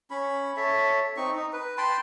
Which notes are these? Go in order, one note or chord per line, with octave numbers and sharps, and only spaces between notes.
C#4 B5
A4 C#5 E5
C4 D#4 C#6
D#4
B4
G5 A5 B5 C6